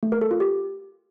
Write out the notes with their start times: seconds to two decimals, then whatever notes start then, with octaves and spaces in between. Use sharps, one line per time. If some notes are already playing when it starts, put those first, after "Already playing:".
0.03 A3
0.12 A#4
0.21 A4
0.31 F4
0.40 G4